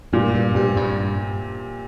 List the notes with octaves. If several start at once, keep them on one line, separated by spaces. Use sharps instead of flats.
G2 A#2
G2
G2 C3
G2